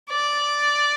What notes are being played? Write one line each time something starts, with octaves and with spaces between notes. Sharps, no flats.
D5